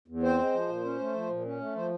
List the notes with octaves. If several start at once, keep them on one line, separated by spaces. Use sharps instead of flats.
E2
C4 C5
G#3
F3
A#2
C#4
A3
F3
A#2
C#4
A3
F3 C5